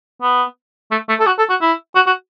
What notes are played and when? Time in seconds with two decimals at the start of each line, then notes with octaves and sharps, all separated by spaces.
0.22 B3
0.91 A3
1.09 A3
1.20 A4
1.26 F#4
1.38 A4
1.49 F#4
1.61 E4
1.95 F#4
2.07 F#4